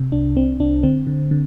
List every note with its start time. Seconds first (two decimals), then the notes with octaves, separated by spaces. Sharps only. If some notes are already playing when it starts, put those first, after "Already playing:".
Already playing: C3
0.12 C2 D4
0.36 C2 C4
0.60 C2 D4
0.83 D3 C4
1.07 D3
1.31 D3